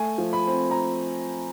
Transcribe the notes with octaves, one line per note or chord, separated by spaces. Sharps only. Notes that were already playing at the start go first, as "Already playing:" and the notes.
Already playing: A3 G#5
F3
B5
C4
A#5